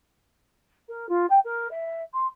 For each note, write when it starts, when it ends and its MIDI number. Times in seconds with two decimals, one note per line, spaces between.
0.89 1.09 70
1.09 1.26 65
1.30 1.39 79
1.45 1.68 70
1.71 2.01 76
2.14 2.27 84